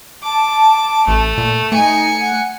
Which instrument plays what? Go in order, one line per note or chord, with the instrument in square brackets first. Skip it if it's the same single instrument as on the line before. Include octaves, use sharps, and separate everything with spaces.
[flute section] A5 [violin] D6
[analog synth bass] A1 [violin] A3
[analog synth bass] A#2
[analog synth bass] A3 [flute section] D#4 [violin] G#5 C#7
[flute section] F#5